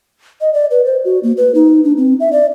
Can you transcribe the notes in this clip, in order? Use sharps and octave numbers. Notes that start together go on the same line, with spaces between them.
D#5
D5
B4
C5
F#4
A#3
B4
D#4
D4
C4
E5
D5